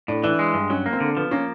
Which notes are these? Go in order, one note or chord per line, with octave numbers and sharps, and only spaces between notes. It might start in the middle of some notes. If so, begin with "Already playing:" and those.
A2 D4
E3 D4
G#3
G2
F#3 C#4
A#3
C4
D3
F3 B3
A#3 C#4